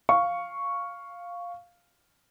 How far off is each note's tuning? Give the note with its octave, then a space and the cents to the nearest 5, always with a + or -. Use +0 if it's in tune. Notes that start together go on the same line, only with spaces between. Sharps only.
F5 +0 C#6 +0